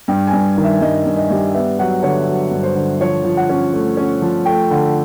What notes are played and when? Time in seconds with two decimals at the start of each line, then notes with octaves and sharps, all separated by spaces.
0.08 G2 G5
0.27 G#5
0.33 G2
0.57 D#3
0.64 E5
0.81 G2 D#5
1.06 G2
1.17 D#5
1.30 G3
1.54 B3 E5
1.79 F#3 F#5
2.03 D3 C#5
2.27 F#3
2.51 G2
2.63 C5
2.75 D3
3.00 F3 C#5
3.24 F3
3.37 F#5
3.49 C#4
3.73 A3
3.97 C#4
4.22 F3
4.46 A3 G5
4.71 D3